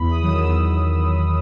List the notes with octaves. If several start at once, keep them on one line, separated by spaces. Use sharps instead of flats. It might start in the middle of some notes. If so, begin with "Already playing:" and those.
Already playing: E2 B5
D#6
D#3 F#3
E6
E2